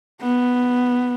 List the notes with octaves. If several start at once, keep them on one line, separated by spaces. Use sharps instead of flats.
B3